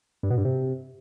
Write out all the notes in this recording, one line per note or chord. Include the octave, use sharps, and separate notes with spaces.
G2
B2
G2
C3